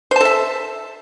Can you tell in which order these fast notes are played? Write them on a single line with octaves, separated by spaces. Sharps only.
C5 A5 A4 E5